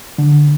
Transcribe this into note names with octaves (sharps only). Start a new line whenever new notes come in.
D3